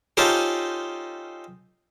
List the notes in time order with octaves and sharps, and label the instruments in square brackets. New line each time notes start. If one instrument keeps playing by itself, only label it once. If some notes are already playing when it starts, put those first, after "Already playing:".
[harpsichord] C#4 D#4 F4 G4 A4 C5